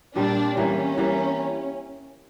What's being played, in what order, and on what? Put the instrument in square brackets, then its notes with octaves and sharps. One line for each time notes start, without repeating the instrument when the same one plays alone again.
[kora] A#2 G3 C4 F4 [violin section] D4
[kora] E3 G3 A#3 [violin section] C#4
[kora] E3 G3 A#3